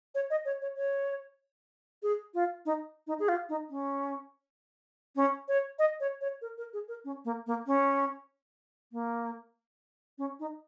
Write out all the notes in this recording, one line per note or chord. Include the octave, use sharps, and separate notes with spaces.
C#5
D#5
C#5
C#5
C#5
G#4
F4
D#4
D#4
G#4
F4
D#4
C#4
C#4
C#5
D#5
C#5
C#5
A#4
A#4
G#4
A#4
C#4
A#3
A#3
C#4
A#3
C#4
D#4